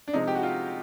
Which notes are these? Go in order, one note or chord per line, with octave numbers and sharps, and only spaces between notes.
D4
C3 F3 G#3 D#4
G4
F#4
F4